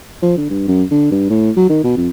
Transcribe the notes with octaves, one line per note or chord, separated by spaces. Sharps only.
F3
D3
G2
F#2
D3
G2
A2
F#3
D#3
B2
F2